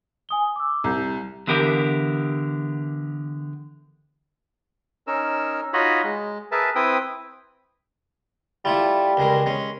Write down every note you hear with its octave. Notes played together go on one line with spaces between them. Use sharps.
G#5 D#6 G7
D6 E6
C2 A#5 G6
D3 E3 B3 G4 A#4
C#4 D#4 A#4 E6
D#4 F4 F#4 C#5 D#5 B5
G#3
G#4 A#4 B4 E5 A5
C4 E4 B4 G5 D#6
G3 A3 E4 F4
C#2 G#3 A#4
G#3 C#4